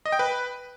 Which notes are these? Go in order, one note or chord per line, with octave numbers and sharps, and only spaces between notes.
D#5
G5
B4